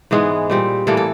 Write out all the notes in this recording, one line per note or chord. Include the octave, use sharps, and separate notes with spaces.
G#2 E3 G#3 B3 G#4
A#2 G3 C4
A2 E3 G3 A#3 A4
A4